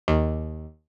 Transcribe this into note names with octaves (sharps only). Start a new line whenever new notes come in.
D#2